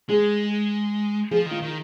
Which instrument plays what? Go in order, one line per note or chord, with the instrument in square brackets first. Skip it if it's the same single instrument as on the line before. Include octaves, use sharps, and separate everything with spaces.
[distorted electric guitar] G#3 [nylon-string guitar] G#4
[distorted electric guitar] F3 [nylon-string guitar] G#4
[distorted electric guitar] D#3
[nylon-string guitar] F4
[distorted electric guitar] D#3